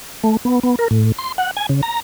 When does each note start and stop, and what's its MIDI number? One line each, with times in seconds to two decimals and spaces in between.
0.24 0.37 57
0.45 0.60 59
0.63 0.75 59
0.79 0.88 70
0.91 1.12 45
1.18 1.32 84
1.38 1.51 78
1.57 1.66 80
1.69 1.81 49
1.83 2.00 82